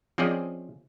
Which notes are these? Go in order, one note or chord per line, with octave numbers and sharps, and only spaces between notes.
F3 C4 C#4 G#4 D5 D#5